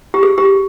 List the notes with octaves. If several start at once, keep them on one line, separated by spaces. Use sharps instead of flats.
G4
G#4
G4